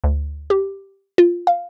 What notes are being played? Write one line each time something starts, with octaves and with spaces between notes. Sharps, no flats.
D2
G4
F4
F5